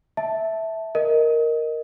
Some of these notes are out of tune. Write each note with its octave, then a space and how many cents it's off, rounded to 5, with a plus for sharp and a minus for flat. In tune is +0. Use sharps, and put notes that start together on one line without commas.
E5 -10 A5 +0
A#4 +0 D#5 +0